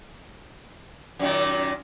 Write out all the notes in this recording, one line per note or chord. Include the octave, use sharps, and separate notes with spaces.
F#2 A#2 D#3